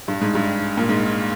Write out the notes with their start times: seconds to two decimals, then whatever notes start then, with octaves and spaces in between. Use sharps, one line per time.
0.08 G2
0.21 G#2
0.35 G2
0.77 A#2
0.89 G#2